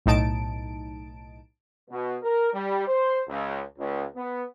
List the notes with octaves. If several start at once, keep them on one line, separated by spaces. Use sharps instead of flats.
B1 A2 D#4 A5 D7
B2
A#4
G3
C5
C#2
C#2
B3